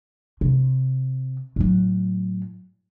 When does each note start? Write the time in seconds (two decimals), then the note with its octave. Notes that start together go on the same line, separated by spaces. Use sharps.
0.41 C3
1.56 A2 F#3